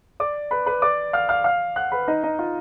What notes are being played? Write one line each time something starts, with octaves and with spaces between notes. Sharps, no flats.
D5 D6
B4 B5
B4 B5
D5 D6
F5 F6
F5 F6
F5 F6
F#5 F#6
B4 B5
D#4 D#5
D#4 D#5
F4 F5